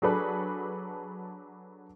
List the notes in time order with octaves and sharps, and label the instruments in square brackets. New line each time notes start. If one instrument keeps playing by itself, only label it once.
[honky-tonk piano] F#3 D4 G#4 A4 B4